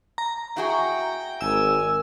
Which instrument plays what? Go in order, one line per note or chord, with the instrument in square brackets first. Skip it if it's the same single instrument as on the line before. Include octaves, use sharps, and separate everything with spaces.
[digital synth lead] A#5
[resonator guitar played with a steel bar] E4 F#4 G#4 [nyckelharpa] G5
[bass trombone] G#1 [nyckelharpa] A#4 G#5 [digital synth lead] E6